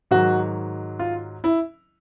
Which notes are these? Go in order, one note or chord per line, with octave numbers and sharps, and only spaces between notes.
G#2 D#3 F#3 F#4
F4
E4